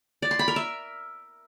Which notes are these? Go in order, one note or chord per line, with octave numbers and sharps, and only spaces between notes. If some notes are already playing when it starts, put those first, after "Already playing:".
D5
C6
B5
A#4
E5